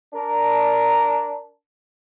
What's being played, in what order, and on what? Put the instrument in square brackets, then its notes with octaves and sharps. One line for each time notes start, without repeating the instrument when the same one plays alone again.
[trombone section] D4 A#4